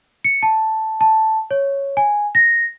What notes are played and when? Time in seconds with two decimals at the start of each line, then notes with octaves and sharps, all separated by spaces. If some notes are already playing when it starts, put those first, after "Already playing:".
0.24 C#7
0.43 A5
1.01 A5
1.51 C#5
1.97 G#5
2.35 A#6